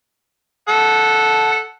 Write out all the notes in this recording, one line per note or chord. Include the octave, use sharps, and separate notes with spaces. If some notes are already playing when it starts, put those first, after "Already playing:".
A4 F#5